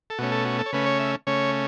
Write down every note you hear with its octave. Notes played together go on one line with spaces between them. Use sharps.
A4
B2 A3 C#4 F#4
A4
F#4
A4
C#5
C#3 A3 C#4 B4
C#5
E5
C#3 A3 C#4 C#5